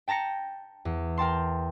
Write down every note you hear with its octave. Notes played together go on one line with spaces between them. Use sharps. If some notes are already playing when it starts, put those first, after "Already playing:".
G5 A5 A#5 A#6 C#7
E2
A#4 G5 A5 C6